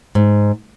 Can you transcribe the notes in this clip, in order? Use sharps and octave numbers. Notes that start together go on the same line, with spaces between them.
G#2